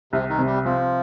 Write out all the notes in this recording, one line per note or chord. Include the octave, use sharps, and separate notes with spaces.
C2 C3
D#3
C3
G3
F3 C4